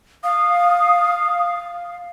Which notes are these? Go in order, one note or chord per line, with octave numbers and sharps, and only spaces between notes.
F5 D#6